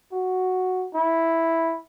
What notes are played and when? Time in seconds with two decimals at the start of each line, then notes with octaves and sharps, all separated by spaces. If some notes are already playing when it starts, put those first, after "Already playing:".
0.12 F#4
0.95 E4